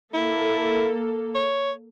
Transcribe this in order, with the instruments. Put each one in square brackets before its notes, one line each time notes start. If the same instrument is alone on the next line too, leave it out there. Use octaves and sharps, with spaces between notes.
[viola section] A#3 A4 [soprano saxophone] E4
[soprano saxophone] C#5